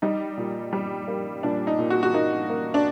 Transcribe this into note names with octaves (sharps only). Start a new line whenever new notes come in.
G3 D#4
A#2
G3
A#3
A#2 D4
D#4
A#2
F#4
F#4
A#3 D#4
A#3
D4